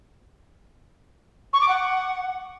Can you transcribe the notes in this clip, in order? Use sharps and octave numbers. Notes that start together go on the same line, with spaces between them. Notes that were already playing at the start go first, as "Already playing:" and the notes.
C#6
D6
F#5